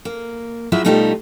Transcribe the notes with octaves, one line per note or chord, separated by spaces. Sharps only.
A#3
F#3 G#3 E4 F4 E5
B2 G3 A3 D#4 F4 G4